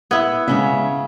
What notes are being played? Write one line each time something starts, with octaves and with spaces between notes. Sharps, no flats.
B3 E4 G#6
C#3 G#3 C#4 E5